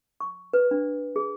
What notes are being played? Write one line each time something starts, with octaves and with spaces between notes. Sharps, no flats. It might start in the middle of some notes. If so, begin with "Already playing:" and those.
C#6
B4
D4
G#4